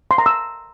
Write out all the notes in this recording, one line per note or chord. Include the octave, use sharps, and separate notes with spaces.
C6
A#5
E6